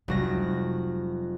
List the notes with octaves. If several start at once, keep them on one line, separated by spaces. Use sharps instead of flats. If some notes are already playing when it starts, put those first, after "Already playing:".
F1 F#3 G3 F#4 A#6